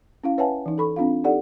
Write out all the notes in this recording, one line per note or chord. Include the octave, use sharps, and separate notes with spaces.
C#4 E4 F5
B4 C#5 E5 F#5 G#5 A5
E3 D#4
A4 B5 C#6
C4 D4 F4 F5
D#4 G4 A4 D5 F#5